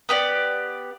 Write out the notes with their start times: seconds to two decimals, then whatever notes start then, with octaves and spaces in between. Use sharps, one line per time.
0.09 B3 G4 D5